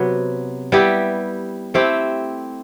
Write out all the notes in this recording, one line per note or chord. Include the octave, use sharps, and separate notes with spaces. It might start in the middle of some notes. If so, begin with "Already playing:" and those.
Already playing: C3 F#3 B3
G3 B3 E4 G4
A3 C4 E4 G4